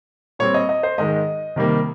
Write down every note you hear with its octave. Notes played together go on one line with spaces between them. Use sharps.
A#2 G3 C4 C#5
D#5
D#5
C5
G#2 D#3 G#3 D#5
C3 D#3 G3 A#3